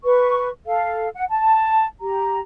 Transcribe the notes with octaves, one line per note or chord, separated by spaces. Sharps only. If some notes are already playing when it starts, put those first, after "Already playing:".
B4 C#6
A4 F5
F#5
A5
G4 A#5